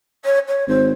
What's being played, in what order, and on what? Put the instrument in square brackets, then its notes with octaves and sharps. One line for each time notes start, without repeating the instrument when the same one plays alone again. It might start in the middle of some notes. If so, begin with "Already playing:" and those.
[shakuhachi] C#5
C#5
[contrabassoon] G#1 [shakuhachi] C5